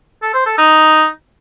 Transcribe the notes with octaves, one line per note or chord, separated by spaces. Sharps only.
A4
C5
A4
D#4